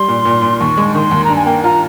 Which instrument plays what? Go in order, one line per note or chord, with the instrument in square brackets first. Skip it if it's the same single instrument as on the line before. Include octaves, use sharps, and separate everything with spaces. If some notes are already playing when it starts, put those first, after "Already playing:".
Already playing: [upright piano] G3 [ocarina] C6
[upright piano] A#2
A#2
A#2
[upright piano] D#2 [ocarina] C#6
[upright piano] G#3
[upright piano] D#3 [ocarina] C6 C#6
[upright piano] D#2
[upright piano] G2 [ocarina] A#5
[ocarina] G#5
[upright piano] A#3 [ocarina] G5
[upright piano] F4 [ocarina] A#5